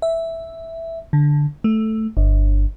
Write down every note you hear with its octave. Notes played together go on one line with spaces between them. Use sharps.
E5
D3
A3
G1